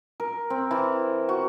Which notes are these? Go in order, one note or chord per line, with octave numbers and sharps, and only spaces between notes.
A#4
C4
E3
F#4